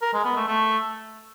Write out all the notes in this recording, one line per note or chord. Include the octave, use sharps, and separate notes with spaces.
A#4
G#3
B3
A3
A3